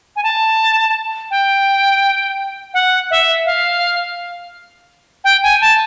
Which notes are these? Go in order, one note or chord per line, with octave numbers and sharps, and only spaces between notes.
G#5
A5
G5
F#5
E5
F5
G5
G#5
A5